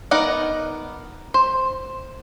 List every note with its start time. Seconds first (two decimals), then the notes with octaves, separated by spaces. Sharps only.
0.11 B3 D#4 A#4 D5 F#5
1.34 C5